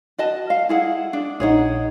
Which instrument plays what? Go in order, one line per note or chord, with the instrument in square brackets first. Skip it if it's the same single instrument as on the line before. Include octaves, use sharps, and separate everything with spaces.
[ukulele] F#4 D#5 A5
F5
E4 G#4 F#5
D4
[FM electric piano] A#1 D#4 [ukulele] G#4 C#5 F#5